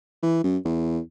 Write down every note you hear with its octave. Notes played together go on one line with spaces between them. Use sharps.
E3
F#2
E2